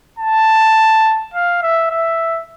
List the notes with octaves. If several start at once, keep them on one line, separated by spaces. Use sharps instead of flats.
A5
F5
E5
E5